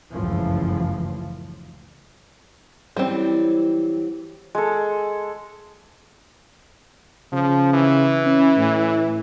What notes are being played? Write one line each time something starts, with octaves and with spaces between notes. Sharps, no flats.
G1 C#2 F#2 A2 E3 F3
E3 F#3 G3 C4
G#3 A4
C#3 F3
E3
C#4
A2